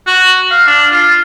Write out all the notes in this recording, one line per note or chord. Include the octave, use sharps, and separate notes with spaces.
F#4
F5
D4
F4